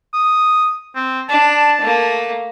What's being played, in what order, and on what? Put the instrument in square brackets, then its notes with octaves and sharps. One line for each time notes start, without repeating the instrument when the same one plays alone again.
[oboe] D#6
C4
[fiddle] D4 [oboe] A5
[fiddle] A3 A#3